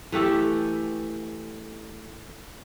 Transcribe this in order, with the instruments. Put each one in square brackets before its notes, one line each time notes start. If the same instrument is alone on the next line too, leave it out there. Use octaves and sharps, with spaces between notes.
[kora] E3 A3 G4 A4